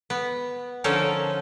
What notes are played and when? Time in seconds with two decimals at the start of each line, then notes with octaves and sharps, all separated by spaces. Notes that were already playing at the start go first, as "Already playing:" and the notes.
0.10 B3
0.84 D3 F3 C#4 D#4 A4 A#4